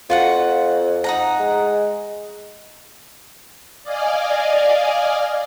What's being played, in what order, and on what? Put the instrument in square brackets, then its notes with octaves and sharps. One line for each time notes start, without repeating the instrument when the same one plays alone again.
[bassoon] F2 [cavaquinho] F4 F#4 F#5
[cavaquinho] D#4 F#5 A#5
[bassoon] G#3
[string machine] D5 D#5 F5 G#5